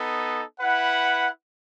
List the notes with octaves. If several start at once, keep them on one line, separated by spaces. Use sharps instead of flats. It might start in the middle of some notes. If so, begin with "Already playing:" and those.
Already playing: B3 D#4 A4
E4 B4 F#5